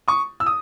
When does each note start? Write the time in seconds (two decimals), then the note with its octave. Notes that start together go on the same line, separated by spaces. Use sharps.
0.08 C#6 D#6
0.40 E6
0.46 D#6